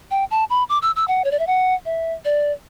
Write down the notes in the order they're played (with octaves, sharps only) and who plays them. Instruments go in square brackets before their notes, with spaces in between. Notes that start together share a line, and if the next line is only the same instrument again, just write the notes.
[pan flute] G5
A5
B5
D6
E6
E6
F#5
C#5
D5
E5
F#5
E5
D5